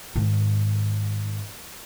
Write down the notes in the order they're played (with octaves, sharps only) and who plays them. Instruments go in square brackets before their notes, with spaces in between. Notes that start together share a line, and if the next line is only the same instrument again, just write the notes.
[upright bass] G#2 D#3